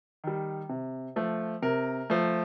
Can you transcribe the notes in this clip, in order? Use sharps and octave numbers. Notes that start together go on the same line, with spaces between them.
D#3 G3
C3
F3 A3
C3 A#4
F3 A3